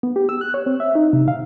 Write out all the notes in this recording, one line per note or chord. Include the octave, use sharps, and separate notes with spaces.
B3
G4
E6
F#6
C#5
C4
E5
D#4
C3
F5